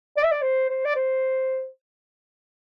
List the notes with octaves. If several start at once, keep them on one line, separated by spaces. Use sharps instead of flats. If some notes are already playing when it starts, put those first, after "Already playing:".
D5
E5
D5
C5
C5
D5
C5